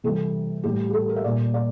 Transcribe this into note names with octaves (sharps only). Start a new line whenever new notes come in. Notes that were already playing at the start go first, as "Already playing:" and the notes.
C3 E3 G3 A4
A2 G3 G4
G4
A4
A#4
E5
A#2 G3 D5
D5